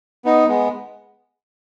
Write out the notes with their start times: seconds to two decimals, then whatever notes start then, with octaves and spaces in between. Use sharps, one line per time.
0.25 B3 D#4
0.48 G#3 B3